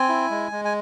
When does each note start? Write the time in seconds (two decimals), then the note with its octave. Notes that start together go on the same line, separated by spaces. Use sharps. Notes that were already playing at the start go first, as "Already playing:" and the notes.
Already playing: C4 G#5
0.09 E4
0.30 G#3
0.52 G#3
0.65 G#5